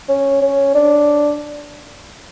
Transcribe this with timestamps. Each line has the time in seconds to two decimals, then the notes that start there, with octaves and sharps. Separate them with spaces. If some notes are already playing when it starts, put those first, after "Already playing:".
0.09 C#4
0.42 C#4
0.75 D4